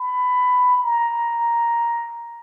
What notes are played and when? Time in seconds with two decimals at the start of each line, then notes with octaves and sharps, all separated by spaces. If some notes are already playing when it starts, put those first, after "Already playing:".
Already playing: B5
0.83 A#5